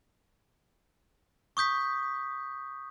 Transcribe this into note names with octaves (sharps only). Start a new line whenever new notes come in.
C#6 D#6 G6 B6